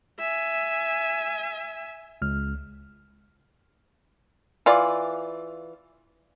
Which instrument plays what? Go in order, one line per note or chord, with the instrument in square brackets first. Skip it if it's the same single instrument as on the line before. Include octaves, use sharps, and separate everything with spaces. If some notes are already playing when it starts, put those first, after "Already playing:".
[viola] E5 G#5
[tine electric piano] C#2 F6
[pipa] E3 F4 D5